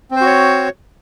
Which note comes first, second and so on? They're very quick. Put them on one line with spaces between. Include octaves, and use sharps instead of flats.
C4 C5 F#4 C#5